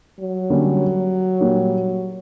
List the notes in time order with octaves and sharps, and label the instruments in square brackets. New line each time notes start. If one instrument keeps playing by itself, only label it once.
[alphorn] F#3
[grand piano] D3 G3 A#3 C#4
A#2 G3 A#3